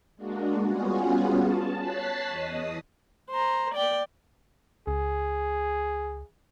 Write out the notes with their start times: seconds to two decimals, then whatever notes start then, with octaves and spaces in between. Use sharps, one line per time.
0.16 G#3 A#3 D4 F#4
0.64 G3 B3 C#4 F4 F#4 G#4
1.38 A5
1.80 C#5 A5 F#6 A6 B6 C7
2.29 E2 D#5 D#6
3.30 C5 A#5
3.74 D5 G5
4.87 C#2 G#4